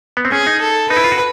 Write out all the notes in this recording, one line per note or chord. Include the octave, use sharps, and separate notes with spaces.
B3
C4
C#4 G#4
D#4
A4
D#4 B4
E4
F4
F#4